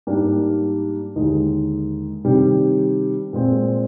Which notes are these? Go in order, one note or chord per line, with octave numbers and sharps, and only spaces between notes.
G#2 G3 A#3 D4
D#2 D3 G#3 D#4
C3 D#3 G3 D4
A#2 G#3 C4